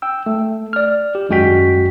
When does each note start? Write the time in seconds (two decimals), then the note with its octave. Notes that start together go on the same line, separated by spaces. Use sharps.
0.02 G5 E6
0.26 A3
0.73 D5 F6
1.15 G4
1.29 G#1 F#2 G#3 F#4 G5 B6